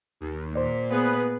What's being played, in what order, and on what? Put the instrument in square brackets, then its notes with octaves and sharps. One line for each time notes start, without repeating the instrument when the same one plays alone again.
[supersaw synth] D#2
[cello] A#2 [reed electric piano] C5 D5
[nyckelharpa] B3 G#4 [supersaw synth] B4